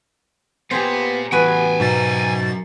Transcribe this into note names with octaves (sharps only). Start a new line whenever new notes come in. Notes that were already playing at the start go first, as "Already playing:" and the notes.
A#2 B3 G4 G#4 C5
E2 A2 F#4 G#4 B4 G5 G#5
G#2 B2 F#3 A#4 A6